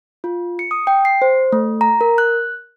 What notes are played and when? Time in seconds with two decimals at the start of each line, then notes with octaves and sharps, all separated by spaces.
0.24 F4
0.59 C#7
0.71 D#6
0.87 G5
1.05 C7
1.22 C5
1.52 A3
1.81 A#5
2.01 A#4
2.18 F#6